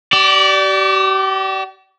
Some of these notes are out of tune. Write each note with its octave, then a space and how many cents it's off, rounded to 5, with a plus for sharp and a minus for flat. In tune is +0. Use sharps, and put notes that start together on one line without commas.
G4 -40 D5 +0